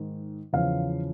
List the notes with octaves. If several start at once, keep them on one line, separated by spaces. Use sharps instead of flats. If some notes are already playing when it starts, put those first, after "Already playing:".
Already playing: G#2 D#3
E2 C#3 F3 F5